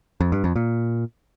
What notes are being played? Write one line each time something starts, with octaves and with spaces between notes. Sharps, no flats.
F2
G2
F2
A#2